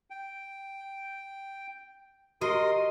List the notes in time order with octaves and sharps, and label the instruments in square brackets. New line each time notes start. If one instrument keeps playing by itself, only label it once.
[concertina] G5
[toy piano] F#4 G4 [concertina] A#4 C6 D#6 [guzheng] D#5